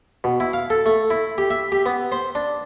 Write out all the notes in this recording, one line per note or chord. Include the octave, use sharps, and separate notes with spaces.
B2
E4
F5
A4
A3
E4
G4
E5
G4
B3
C5
D4